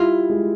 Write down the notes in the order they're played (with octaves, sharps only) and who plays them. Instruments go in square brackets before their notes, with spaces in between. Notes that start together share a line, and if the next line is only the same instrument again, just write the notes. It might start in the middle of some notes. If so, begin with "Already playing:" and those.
Already playing: [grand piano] G3 E4 [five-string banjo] F4
[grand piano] G#3